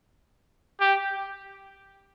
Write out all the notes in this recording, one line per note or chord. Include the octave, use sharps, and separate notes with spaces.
G4